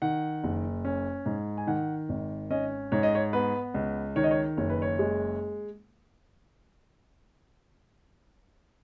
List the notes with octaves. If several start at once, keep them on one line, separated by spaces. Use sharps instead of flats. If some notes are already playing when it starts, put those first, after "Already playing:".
D#3 F#5
F#1
C#4
G#2
G#5
D#3 F#5
G#1
C#4 D#5
G#2 C#5
D#5
C#5
B3 B4
C#2
D#3 C#5
D#5
C#5
F#1 C#5
B4
C#5
G#3